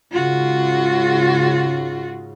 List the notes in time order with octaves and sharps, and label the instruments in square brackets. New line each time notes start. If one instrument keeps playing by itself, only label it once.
[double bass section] G#2 C#3 [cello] F4 F#4